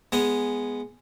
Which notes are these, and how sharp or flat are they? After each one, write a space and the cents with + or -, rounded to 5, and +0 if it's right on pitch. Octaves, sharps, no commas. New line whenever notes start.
G#3 +0 B3 +0 G#5 -5